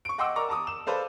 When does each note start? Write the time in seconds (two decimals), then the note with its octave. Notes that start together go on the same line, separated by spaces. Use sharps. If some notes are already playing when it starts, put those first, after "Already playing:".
0.05 C#6 D7
0.18 D#5 F#5 G5 C6 D6 E6
0.36 A#4 D5 A#5 C#6 D6
0.49 A5 A#5 D6 D#6
0.67 E7
0.86 A4 B4 C5 D5 F5